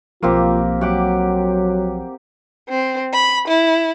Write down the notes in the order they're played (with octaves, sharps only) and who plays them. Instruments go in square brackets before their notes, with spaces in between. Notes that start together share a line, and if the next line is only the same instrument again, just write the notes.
[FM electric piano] B1 F3 [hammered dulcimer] A#3 C4 G4 [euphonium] F4
[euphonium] F#3 [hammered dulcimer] G4 F#5 D6
[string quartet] C4
B5
E4